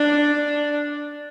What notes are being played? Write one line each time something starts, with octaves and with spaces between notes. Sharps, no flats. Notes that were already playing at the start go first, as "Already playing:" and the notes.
Already playing: D4